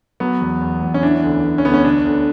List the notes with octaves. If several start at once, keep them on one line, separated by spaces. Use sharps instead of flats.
F#3 B3
E2
E2
E2
C#4
E3 D4
D2
E3
C#4
D2 B3
C#4
D2 D4
D2